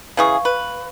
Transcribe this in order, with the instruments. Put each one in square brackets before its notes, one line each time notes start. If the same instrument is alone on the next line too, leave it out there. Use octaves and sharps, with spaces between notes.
[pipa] C#3 E3 G#4 [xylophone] F5 C#6
[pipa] B4